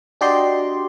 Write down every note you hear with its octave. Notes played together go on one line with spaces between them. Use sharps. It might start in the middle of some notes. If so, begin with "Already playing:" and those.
D4 F#4 G4 D5 D#5 C6